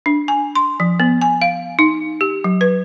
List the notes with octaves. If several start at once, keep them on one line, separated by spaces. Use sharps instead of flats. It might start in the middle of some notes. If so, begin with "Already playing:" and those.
D4
G#5
C6
F3
B3
G#5
F5
D#4
G4
F#3
B4